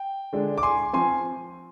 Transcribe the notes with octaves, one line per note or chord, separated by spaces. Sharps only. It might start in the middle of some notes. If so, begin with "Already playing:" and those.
Already playing: G5
D3 G#3 D4
D6
G#5 C6
F3 C4 G#5 C6